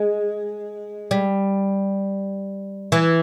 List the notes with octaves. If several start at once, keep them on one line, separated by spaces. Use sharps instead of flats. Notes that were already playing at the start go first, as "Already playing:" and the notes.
Already playing: G#3
G3
E3